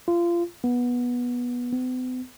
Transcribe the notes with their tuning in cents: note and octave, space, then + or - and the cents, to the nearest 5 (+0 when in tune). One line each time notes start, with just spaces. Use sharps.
F4 -25
B3 -15
B3 +45